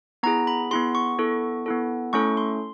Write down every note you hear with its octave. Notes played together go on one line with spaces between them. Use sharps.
B3 E4 G#4 A#5
B5
B3 E4 G#4 C6
C#6
B3 E4 A4
B3 E4 A4
A3 C#4 E4 A4 C#6
C6